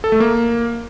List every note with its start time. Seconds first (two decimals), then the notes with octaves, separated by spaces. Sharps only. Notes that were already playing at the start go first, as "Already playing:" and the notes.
0.04 A4
0.12 A3
0.20 A#3